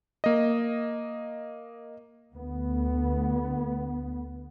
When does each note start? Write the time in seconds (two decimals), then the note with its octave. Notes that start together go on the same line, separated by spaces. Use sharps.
0.24 A#3 D#5
2.33 D2 B3